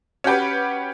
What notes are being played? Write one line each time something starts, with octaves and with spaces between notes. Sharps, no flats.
C#4 F#4 G4 B4